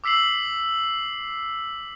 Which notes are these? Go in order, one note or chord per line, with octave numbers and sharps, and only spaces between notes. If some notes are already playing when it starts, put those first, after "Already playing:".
D6 E6 B6 C7 F#7